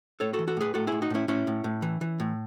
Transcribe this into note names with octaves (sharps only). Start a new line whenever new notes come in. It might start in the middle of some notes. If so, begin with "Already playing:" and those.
A2 A4 C#5
F#4 A4
E3
F#4 A4
A2 G#4 B4
A2 F#4 A4
A2 E4 G#4
D#4 F#4
A2 C#4 E4
A2 C#4 E4
A2
A2
E3
E3
A2